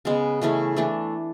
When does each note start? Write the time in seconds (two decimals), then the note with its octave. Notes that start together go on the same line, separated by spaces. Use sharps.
0.05 C#3 G#3 B3
0.42 C#3 E3 A3 C#4
0.76 E3 A3 D4